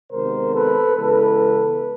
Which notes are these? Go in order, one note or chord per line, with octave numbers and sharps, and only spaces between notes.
C3 D#3 G#3 B3 A#4 C5
A4 B4
C#3 E3 G#3 B3 A4 B4